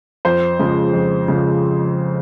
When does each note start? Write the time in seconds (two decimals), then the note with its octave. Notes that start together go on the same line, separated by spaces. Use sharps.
0.25 F2 C5
0.59 C#3 F3 G#3
0.93 F2
1.28 C#3 F3 G#3